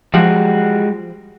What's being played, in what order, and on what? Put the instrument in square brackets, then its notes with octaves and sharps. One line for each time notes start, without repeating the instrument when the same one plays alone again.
[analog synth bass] F3 [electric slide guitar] G3 G#3 F#4